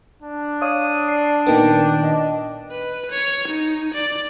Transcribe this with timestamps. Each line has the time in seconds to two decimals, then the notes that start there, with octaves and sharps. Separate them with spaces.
0.22 D4
0.62 C#5 F5 D#6
1.08 D5 C7
1.47 A#2 D#3 B3 G5
2.03 D#5
2.71 B4
3.11 C#5
3.48 D#4
3.94 D5